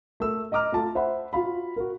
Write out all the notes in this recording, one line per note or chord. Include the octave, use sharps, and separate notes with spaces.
A3 A#4 E6
D#5 A#5 D6 F6
A3 F4 A5
C5 E5 F#5 B5
F4 F#4 F5 B5
F#4 A#4